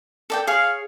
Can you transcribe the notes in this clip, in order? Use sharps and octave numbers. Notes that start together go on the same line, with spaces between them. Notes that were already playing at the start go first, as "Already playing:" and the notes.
A4 D5 G5
G#4 C#5 F5